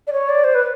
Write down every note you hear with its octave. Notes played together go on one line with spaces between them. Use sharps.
D5
C#5
D5
C5
B4